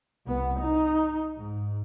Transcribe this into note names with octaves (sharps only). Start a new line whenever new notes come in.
C2 B3
D#4
G#2